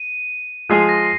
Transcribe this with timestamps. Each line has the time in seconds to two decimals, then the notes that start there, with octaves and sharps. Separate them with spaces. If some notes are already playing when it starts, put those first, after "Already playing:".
Already playing: D#7
0.69 F3 G#3 F4 G#4 C7
0.89 A#6